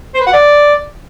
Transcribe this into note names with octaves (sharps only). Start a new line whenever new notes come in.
C5
B4
F#5
D5